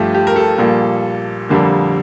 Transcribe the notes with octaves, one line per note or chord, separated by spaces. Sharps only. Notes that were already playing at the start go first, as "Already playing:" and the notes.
Already playing: G2 F3 A3 G4
G4
A#4
A4
A#1 A#2 G3 A#3
F1 F2 D3 G3 A#3